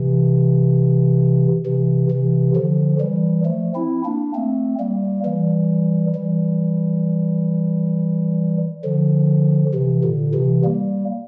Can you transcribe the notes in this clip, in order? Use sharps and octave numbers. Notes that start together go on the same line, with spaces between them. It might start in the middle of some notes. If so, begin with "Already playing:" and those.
Already playing: C3 E3
C3 E3
C3 E3
D3 F3
E3 G3
F3 A3
C4 E4
A#3 D4
A3 C4
G3 A#3
E3 G3
E3 G3
D3 F3
C3 E3
A#2 D3
C3 E3
G3 A#3